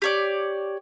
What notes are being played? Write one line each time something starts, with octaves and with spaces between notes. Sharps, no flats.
G4 C#5 D5